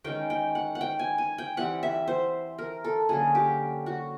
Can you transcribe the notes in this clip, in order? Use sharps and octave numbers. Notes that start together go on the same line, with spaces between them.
D#3 G#3 C#4 G5
G5
F#5
F#5
G5
G#5
G#5
G5
E3 G3 C4 F#5
E5
C5
A#4
A4
D3 F#3 A#3 C#4 G#4
G4
F#4